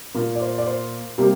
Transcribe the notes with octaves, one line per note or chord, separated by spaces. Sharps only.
A#2 A#3
D5
C5
D5
C5
C3 G3 A#3